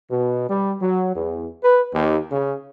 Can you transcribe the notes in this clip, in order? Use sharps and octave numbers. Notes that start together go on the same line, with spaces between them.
B2
G3
F#3
E2
B4
D#2
C#3